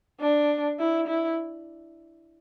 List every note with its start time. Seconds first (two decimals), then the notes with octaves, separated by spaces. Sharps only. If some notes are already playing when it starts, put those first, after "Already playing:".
0.21 D4
0.79 E4
1.08 E4